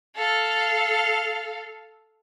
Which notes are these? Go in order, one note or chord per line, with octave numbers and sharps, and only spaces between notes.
A4 F5